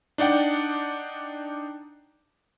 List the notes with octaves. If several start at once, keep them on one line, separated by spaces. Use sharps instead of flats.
D4 D#4 D5 F#5 G5